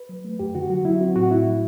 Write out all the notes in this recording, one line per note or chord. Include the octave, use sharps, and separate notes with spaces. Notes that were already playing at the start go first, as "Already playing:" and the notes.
Already playing: B4
F#3
A3
F#2 G4
D3 F#4
F#3 F#4
F#3 E4
C4 F#4
A2 F#4
A2 E4
F#3